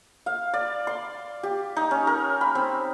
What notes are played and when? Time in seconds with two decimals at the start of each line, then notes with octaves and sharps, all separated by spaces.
0.26 F5
0.54 D5
0.87 C6
1.43 G4
1.77 D#4
1.91 C#4
2.07 A#4
2.41 B5
2.55 C4